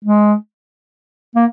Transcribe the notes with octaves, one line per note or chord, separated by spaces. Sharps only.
G#3
A#3